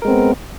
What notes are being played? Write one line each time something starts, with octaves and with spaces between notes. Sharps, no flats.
G#3 B3 C4 A#4